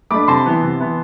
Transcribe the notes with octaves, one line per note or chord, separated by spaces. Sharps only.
A3 D4 B5 D6
C3 A5 C6
E3 B3 E4
C3
E3 B3 E4